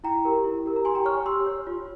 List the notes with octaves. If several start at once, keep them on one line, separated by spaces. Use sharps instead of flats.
E4 G5 A#5
G4 A#4
E4
G4 A#4
A#5
G4 G#5 C6
G5 A#5
C#5 C#6 F6
G4 C6 E6
C#5
F4